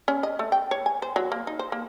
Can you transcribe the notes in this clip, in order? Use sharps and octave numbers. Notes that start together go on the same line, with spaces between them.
C#4
D#5
A3
G5
C#5
G#5
C5
F#3
A#3
D#4
C5
A#3